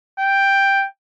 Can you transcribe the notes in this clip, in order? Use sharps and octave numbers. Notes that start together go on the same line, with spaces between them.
G5